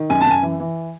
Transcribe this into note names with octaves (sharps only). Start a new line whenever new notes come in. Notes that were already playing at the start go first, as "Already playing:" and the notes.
Already playing: D#3
F#2 G#5
A5
F#2 G#5
E3
E3